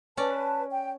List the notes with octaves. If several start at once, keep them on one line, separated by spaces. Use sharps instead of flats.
C#4 B4 D5 A5
G5